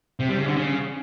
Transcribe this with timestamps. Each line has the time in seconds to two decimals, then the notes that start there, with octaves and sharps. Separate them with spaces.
0.20 C3
0.29 G3
0.38 C#3
0.47 D3
0.56 C#3